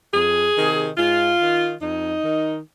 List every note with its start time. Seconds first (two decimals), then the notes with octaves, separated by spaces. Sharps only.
0.13 F2 G#4
0.56 C3 D#3
0.98 G#2 F4
1.41 D#3
1.82 F2 D#4
2.24 D#3